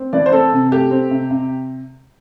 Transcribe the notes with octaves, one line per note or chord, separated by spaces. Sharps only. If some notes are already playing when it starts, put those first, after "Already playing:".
Already playing: C4
E3 D5
C5
C4 A4
C3
A3 G4
C4
C3
C3